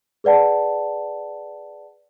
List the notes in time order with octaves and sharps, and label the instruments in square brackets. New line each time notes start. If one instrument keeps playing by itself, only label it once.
[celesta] G#4 B4 D5 F#5 A5